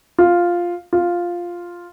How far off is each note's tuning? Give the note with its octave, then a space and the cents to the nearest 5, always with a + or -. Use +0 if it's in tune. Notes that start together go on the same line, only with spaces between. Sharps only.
F4 +0
F4 +0